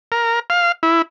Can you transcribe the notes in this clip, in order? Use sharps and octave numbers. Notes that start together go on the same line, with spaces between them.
A#4
F5
E4